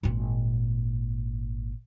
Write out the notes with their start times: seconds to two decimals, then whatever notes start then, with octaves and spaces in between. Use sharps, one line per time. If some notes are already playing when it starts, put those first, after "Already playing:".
0.03 G#1 A#2